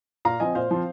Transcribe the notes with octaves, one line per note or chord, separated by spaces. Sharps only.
A#2 F5 A#5
F3 C4 D#5 G#5
A#2 C5 F5
F3 C4